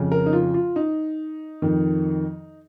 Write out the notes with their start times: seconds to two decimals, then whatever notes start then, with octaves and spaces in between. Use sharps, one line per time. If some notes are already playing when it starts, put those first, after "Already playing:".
Already playing: F2 C#3
0.12 A#4
0.26 D#4
0.33 F4
0.54 F4
0.76 D#4
1.62 F2 D#3